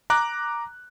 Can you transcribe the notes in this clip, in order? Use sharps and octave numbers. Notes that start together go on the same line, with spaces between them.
A#5 D6 F#6